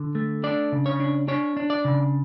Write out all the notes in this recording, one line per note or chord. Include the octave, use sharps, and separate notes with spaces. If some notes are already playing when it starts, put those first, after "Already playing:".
Already playing: D3
A3
D4 D5
C#3
C#5
D4
D4 C#5
D4
D5
C#3